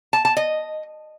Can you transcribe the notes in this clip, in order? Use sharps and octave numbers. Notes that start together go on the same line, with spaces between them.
A5
A5
D#5